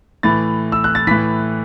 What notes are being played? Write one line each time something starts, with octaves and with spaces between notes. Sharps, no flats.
A2 E3 A6
E6
F#6
A6
A2 E3 B6